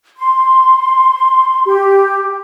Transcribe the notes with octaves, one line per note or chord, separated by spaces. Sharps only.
C6
G4